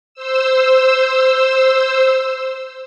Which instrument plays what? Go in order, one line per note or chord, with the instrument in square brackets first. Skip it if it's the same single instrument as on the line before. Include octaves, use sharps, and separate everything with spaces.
[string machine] C5 E6